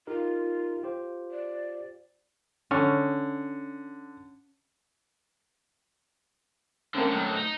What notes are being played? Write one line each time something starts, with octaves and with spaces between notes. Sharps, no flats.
D#4 F4 G4 A#4
F4 G4 C5
D5
D3 C#4
A2 D3 A#3 C4 C#4
A2 F#3
D#4